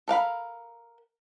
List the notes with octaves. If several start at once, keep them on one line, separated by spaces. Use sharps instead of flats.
A4 A#4 F5 B5